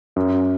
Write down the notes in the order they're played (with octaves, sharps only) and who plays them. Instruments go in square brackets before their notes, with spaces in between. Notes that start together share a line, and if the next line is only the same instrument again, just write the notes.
[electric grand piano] F#2